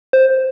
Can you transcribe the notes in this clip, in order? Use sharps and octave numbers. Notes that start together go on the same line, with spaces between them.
C5